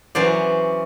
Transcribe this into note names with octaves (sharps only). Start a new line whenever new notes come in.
E3 F#3 C#4 C5 D5